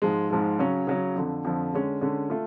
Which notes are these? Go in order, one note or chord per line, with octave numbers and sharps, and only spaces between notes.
G#2 F3 G#3
G#2 F3 G#3
C#3 F#3 C#4
C#3 F#3 C#4
F2 D3 F3
F2 D3 F3
D3 G#3 C#4
D3 G#3 C#4
A3 F4